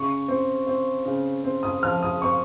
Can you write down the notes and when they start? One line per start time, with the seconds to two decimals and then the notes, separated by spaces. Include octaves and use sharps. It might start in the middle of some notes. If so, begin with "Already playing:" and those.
Already playing: C#3 C#6
0.28 C4
0.67 C4
1.06 C#3
1.44 C4
1.63 D#6
1.83 F3 F6
2.02 D#6
2.22 C4 C#6